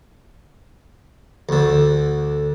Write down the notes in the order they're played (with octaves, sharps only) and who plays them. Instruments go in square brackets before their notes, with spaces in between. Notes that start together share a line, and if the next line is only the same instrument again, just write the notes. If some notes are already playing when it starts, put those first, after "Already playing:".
[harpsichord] D2 D3